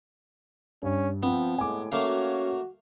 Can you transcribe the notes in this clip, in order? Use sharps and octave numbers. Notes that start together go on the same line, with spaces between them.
G2 C#4
F3 B3 C4
A2 G#3 G#5 D6
A3 A#3 C#4 F#4 F5